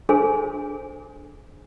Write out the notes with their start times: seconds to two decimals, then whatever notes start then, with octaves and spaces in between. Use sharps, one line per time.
0.09 D4 G#4 A4 C5 G#5